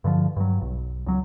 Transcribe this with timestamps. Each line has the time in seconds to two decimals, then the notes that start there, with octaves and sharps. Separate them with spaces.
0.04 G2 D3 D#3 F3
0.36 G2 F#3
0.61 B1
1.06 C#2 F#3